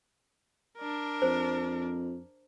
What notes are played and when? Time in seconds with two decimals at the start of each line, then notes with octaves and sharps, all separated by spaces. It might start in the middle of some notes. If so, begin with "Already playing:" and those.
0.78 D4 A#4
1.22 F2 C5